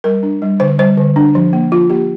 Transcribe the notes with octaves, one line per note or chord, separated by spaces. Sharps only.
G3 A#4
D4
G3
D3 C5
G3 C5
D3
D4
F3
A#3
F3 F4
A#3 G4